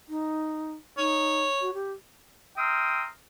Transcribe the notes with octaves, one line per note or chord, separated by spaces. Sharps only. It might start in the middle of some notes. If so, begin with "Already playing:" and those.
D#4
D#4 C#5
F#4
G4
E5 G5 A#5 C6 D#6 F6